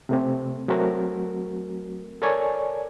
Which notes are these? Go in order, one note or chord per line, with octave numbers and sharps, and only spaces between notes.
C3 A3 C4
F#3 A3 C4 F#4 A#4
A4 A#4 C#5 D5 G#5 C#6